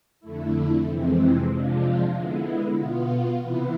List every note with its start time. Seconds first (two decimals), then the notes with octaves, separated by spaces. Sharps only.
0.20 F2 D3 A3 E4
0.85 F2 C3 E3 G#3 C4
1.49 C3 F3 G#3 D4 F4
2.13 D3 G#3 B3 E4
2.76 B2 B3 F4
3.41 C3 E3 B3 E4